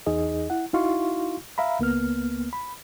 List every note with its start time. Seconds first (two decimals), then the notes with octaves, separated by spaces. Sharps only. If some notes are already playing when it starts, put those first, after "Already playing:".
0.06 E2 D#4 G#4 D#5
0.50 E4 F#5
0.73 D#4 E4 F#4 F5 C6 C#6
1.58 E5 F5 A#5 B5
1.79 C#2 A#3 B3 F6
2.53 B5